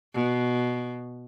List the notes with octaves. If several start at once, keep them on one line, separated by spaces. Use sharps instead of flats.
B2